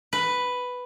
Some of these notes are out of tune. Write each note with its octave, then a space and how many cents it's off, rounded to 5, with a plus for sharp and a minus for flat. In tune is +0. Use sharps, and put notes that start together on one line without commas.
B4 +5